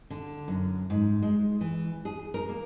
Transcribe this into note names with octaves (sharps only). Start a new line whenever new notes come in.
D3
F#2
G#2
G#3
E3
G#4
A#4
A#3